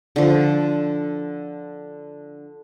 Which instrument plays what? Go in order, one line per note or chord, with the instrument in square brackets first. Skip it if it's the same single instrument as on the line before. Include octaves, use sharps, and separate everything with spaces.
[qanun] D3 F3